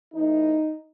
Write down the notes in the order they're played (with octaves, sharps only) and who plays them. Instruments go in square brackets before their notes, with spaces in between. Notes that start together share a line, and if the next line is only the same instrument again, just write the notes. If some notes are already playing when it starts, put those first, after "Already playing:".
[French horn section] A2 E3 D#4